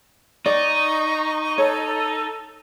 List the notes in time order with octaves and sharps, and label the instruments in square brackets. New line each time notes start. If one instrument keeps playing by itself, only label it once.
[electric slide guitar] D#4 [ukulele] D5 [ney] C#6
[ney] A4 [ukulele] C#5